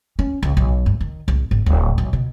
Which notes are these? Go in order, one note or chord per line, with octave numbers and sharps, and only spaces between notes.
C#4
C#2
B1
G2
D#3
C2
G#1
D1
B1
B2